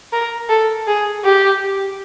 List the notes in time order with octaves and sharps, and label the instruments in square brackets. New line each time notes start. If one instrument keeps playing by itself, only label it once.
[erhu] A#4
A4
G#4
G4